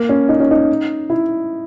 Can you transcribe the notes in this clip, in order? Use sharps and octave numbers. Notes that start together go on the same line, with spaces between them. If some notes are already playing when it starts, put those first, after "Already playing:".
Already playing: A#3
C#4
D#4
C#4
D#4
E4